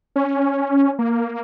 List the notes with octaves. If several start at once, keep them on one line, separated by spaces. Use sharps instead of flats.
C#4
A#3